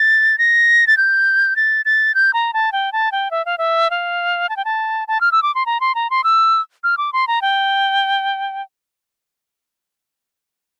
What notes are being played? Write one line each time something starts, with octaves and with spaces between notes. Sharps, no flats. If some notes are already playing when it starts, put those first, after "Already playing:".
Already playing: A6
A#6
A6
G6
A6
A6
G6
A#5
A5
G5
A5
G5
E5
F5
E5
F5
A5
G5
A5
A5
F6
E6
D6
C6
A#5
C6
A#5
C6
E6
F6
D6
C6
A#5
G5